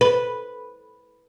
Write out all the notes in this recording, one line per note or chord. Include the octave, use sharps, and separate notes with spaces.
B4